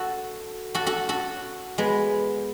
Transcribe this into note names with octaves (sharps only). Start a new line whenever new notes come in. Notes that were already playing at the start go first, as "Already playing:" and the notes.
Already playing: F#4 A4
F#4 A4
F#4 A4
F#4 A4
G#3 B3